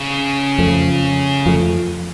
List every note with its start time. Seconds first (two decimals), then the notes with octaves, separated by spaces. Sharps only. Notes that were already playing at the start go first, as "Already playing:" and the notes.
Already playing: C#3
0.58 F2 F3 A3
1.46 F2 F3 A3